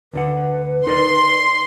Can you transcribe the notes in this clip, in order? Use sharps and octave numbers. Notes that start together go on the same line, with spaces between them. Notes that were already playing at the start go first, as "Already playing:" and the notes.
D2 D3 B4 F#5
D#4 A#4 D5 C6